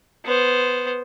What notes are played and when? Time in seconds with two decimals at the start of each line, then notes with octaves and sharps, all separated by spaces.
0.25 B3 C5